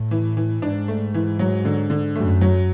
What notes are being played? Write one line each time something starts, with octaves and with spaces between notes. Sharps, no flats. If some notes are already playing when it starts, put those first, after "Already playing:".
Already playing: A2
E3
E3
G#2 D4
A3
E3
F#3
D3
D3
F#2 A3
F#3